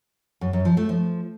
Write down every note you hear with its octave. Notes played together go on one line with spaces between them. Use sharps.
F#2
F#2
F3
A3
F3